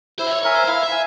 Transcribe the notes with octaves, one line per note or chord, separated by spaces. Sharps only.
E4 C5
E5
C#5
A#4 C#5 E5 G#5
C5
E4 F5
E5
G#5